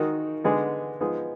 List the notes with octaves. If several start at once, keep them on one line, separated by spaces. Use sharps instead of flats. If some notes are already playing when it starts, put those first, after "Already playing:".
Already playing: D#3 G#3 D#4 F#4 A#4
D3 G#3 B3 D#4 G#4
F3 G#3 B3 D#4 G#4